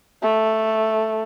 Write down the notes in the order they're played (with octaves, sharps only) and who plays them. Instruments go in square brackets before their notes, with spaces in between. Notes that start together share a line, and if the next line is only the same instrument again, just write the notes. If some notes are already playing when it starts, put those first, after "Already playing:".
[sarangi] A3